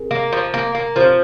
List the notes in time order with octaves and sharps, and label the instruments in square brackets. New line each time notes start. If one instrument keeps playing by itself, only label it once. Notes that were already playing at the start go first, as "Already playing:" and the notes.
Already playing: [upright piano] G#4 A#4
[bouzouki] A#3
F3
A#3
A#3
[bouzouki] F3 [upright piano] C5